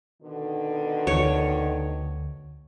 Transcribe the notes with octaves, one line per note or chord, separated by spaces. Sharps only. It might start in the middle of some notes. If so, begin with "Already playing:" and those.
B2 D3 D#3
D2 C#5